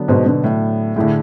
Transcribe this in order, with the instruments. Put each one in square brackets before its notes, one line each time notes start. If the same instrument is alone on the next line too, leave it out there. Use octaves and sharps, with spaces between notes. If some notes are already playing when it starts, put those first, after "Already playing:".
Already playing: [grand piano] D3 F#3 B3 D4
[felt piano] G#2 B2
B2 D3
A2
[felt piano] A2 [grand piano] D3 A3 E4 G#4